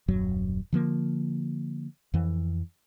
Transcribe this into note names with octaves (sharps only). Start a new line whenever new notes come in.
D#1 F#2 F#3
D3 F3 A#3
F2 E3